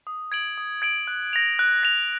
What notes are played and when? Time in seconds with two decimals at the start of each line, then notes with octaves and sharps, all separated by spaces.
0.07 D#6
0.32 G#6 D7 F#7
0.58 D#6
0.82 G#6 D7 F#7
1.07 F#6
1.33 A#6 F7
1.59 F#6
1.83 A#6 F7